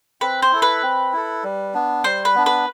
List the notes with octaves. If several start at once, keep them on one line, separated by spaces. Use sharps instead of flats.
C4 B4
C5
E4 A4
B4
C4
E4 A4
G3
B3 D4
G3 C5
B4
B3 D4
B4